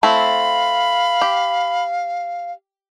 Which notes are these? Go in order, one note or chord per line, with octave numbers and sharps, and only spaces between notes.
A3 C4 E4 F5 B5
G4